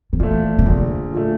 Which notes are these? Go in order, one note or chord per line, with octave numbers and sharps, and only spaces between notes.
D#3
A#2 E3 F3 A3
C#3
A#1 D3
A#2 F3 A3